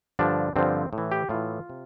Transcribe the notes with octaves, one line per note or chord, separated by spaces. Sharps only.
G2 D3 F3 D4
G2 D3 F3 C4
A2
E3
G4
A2 E3 F4
C3